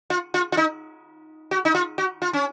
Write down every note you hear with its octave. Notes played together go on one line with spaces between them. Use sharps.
F4
F4
F4
D#4
F#4
D#4
F4
F#4
F4
C#4